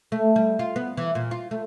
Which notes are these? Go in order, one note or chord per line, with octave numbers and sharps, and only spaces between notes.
A3
G3
F4
B3
E3
A#2
F4
A3